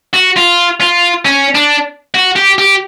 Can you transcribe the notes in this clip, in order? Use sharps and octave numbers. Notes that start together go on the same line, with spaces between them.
F#4
F4
F4
C#4
D4
F#4
G4
G4